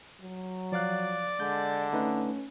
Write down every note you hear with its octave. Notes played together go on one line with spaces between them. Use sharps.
F#3
F3 D5 F5 F#6
D3 G#3 G6
A3 C#4 D#4 B4